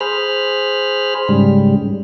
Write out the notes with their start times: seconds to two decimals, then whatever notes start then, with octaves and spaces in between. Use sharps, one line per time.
0.01 G#4 C5 B5 F6
1.29 G#2 C#3 G3